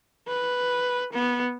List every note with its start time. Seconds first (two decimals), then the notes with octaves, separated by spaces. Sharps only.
0.28 B4
1.13 B3